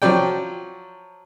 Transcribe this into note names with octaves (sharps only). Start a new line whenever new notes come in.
F3 F#3 D5 G5